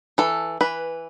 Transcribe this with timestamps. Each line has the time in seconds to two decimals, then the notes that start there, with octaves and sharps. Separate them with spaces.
0.18 E3 A4
0.61 E3 B4